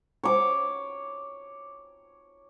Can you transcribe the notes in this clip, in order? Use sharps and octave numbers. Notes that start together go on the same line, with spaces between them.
C#5 D6